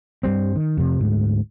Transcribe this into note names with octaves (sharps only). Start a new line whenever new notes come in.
G2 G3 C4
D#3
F2 C3
D2 G#2